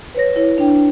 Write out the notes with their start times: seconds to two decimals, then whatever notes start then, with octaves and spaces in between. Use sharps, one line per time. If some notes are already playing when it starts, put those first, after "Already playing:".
0.15 B4 C#5 A#6
0.36 E4 C#5
0.58 D4 G5